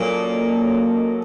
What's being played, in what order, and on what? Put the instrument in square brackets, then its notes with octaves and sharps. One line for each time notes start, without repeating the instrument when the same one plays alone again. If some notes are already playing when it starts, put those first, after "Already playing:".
Already playing: [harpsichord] A#2 [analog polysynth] F#3 A#3 C#4 A4 D#5